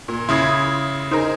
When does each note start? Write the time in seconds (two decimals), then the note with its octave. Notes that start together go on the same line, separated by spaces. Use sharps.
0.08 A#2
0.29 C#3 E4 C6 D#6 G#6
1.11 D#4 G#4 A#4 C5